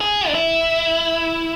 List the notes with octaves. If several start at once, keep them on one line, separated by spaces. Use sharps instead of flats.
G#4
D4
E4